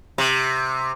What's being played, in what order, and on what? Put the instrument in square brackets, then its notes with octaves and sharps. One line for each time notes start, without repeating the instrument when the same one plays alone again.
[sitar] C3